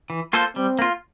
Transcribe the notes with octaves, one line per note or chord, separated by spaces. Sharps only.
E3
A#3 F4 A4 C5
G3 C4
A#3 F4